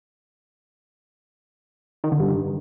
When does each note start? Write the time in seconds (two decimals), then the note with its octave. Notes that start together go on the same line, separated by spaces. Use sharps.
2.04 D#3
2.12 D3
2.20 G2